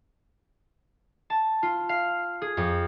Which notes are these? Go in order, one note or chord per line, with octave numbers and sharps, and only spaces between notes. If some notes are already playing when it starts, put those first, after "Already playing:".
A5
F4
F5
G#4
F2